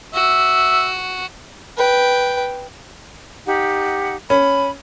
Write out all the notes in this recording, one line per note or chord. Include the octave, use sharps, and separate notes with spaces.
F#4 E5
B4 G5
D#4 G4 F#5
C#4 B5